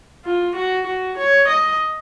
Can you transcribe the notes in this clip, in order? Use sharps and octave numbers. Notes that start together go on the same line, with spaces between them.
F4
F#4
F#4
C#5
D#5